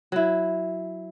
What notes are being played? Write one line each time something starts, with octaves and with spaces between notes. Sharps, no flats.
F#3 E4